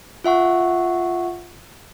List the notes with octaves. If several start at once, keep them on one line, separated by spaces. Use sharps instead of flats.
F4 E5 F#5 C#6